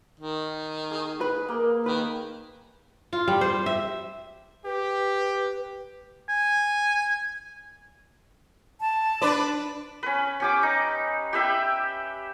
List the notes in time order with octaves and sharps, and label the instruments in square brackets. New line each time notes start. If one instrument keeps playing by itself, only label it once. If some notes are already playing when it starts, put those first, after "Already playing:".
[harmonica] D#3
[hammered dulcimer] G#4
[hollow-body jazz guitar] B4
[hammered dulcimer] A#3
[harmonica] D#3 [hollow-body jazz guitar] B4
[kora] F4
G3
C5
E5
[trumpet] G4 [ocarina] B4
[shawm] G#5
[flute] A5
[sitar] D4 B4 D5
[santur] C#4 B4
C#4 G4 D6
D#4
G4 B4 E5 G5